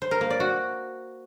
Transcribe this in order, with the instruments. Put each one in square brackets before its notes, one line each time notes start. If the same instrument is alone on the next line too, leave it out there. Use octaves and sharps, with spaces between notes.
[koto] C5
A#4
A#3
D5
F#4